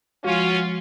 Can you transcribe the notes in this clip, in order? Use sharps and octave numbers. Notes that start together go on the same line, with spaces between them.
F3 G#3 C#4 F4 F#4